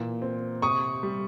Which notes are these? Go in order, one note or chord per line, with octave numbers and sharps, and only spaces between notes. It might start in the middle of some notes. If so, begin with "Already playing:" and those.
Already playing: A#2 E3
C4
C3 C#6 D#6
G3